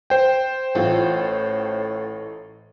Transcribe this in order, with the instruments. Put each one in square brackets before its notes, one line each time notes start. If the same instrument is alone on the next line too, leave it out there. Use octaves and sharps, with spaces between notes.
[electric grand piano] C5 G5
[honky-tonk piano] A1 F4 A4 [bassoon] A2